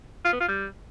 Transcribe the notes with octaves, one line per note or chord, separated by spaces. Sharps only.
F4
B3
F4
G3